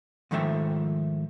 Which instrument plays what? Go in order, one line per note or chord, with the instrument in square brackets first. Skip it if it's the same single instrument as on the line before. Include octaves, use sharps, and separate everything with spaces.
[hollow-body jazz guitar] G#2 D#3 F3 A3 E5 G5